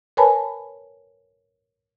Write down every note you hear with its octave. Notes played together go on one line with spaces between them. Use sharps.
A#4 B4 C#5 G#5 A5 B5